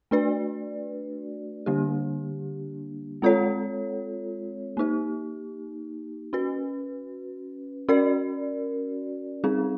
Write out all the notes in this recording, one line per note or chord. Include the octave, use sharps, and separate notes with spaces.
A3 D4 F#4 B4 D5
D3 G3 A#3 D4 G4
G#3 C4 F4 A4 C#5
A#3 D#4 G4
C#4 F#4 B4
C#4 F#4 A#4 D5
G3 C4 D#4 G#4